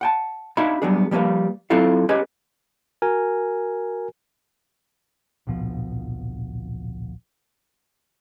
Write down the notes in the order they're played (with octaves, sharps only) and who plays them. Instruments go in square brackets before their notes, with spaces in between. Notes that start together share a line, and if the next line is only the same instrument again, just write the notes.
[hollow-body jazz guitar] F#5 G5 A5
D4 D#4 F#4 E5 F5 B5
F#3 G3 B3 D4 G#4
F3 G3 A#3 B4 F5
F#3 C4 E4 F4 A4 F5
C#4 G4 G#4 B4 D#5
[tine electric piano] F#4 A#4 G#5
[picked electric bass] D1 A#1 B2 F3